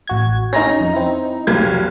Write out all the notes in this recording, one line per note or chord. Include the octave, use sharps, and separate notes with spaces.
A1 F#4 G#6
C#4 D#4 A#5 A#6
F2
C4 E4
F1 B1 G#6